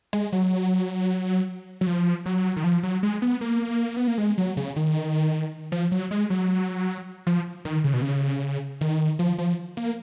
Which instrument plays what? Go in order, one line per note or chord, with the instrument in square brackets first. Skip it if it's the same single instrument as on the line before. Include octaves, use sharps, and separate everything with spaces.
[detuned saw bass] G#3
F#3
F#3
F3
F#3
D#3
F3
F#3
G#3
B3
A#3
B3
A#3
G#3
F#3
C#3
D#3
F3
F#3
G#3
F#3
F3
D#3
C#3
B2
C#3
D#3
F3
F3
A#3